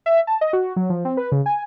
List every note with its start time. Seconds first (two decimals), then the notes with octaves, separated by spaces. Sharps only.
0.06 E5
0.27 A5
0.41 D#5
0.53 F#4
0.76 F#3
0.90 F3
1.05 C4
1.17 B4
1.32 C#3
1.46 G#5